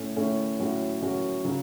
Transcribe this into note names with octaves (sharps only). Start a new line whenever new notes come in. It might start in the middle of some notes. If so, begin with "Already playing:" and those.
Already playing: A2 A3 C#4
A2 A3 C#4
A2 F#3 C#4 F#4
A2 F#3 C#4 F#4
C#3 F#3